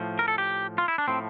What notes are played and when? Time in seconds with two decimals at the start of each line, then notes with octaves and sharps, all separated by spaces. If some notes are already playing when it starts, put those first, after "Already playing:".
Already playing: A2 F3
0.19 A#4
0.28 A4
0.38 G4
0.78 F4
0.88 E4
0.98 D4
1.08 A2 F3 C4